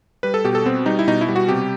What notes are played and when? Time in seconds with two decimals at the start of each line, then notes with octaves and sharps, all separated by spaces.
0.23 G3 B4
0.34 A4
0.44 B2 G4
0.55 A4
0.66 B3 C4
0.86 G3 D#4
0.99 E4
1.07 B2 D#4
1.21 E4
1.29 G3
1.36 F#4
1.48 C3 G4